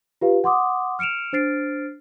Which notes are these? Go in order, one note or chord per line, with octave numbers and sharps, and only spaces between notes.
F4 G4 B4 F5
F#5 C6 D6 D#6
F6 C#7 D7 E7 F7
D4 C5 F6 A6 C7 D7